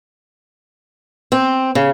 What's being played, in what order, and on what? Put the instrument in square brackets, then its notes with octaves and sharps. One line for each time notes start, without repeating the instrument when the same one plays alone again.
[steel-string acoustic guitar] C4
C#3